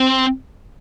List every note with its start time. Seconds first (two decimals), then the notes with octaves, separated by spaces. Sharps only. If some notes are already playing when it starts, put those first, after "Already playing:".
Already playing: C4